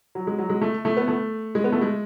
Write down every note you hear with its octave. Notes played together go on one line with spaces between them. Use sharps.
F#3
G#3
F#3
G#3
A3
A3
B3
A3
G#3
B3
A3
G#3